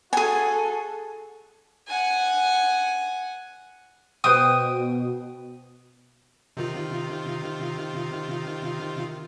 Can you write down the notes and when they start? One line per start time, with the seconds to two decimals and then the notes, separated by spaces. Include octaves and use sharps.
0.13 F#4 G#4 A4 G#5
1.88 F#5 G#5
4.24 B2 B4 C5 G5 D#6
6.57 C3 D#3 F4